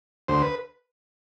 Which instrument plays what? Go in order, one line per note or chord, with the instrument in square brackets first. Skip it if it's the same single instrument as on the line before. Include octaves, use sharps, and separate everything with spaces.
[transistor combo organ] D2 C5
B4